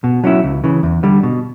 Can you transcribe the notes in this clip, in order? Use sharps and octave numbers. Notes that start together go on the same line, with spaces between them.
B2
F#3 C#4 E4
C#2
C#3 E3
E2
D3 G3
B2